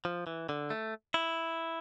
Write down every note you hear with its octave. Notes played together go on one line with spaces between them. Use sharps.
F3
E3
D3
A3
E4